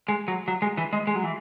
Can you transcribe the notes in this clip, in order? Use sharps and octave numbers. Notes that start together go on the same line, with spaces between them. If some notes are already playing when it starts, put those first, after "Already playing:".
G#3
F#3
F#3
G#3
E3
G#3
G#3
F#3
E3